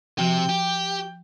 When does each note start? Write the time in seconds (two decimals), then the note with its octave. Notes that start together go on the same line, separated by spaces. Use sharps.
0.19 C3 F3 F#4 G5
0.49 G4